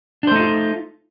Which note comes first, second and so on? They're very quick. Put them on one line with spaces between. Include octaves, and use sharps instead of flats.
D4 C5 A3 D#4 F4